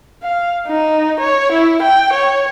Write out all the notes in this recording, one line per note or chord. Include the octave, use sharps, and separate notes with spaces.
F5
D#4
C#5
E4
G5
C#5